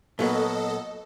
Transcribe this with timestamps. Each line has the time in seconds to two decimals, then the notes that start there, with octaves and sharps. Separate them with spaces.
0.19 A#2 F#3 B3 A4 D#5